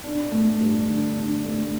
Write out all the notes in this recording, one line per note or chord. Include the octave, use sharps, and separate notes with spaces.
D4
A3
G2
D3
D4
A3